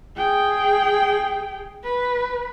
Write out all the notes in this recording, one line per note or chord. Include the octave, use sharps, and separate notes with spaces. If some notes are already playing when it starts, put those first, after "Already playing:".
G#4 G5
B4